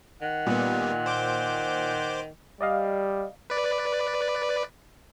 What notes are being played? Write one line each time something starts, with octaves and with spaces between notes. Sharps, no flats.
D#3 F#5
A#2 G3 B3
C5 D6 G6
G3 D5 D#5 F5
B4 D5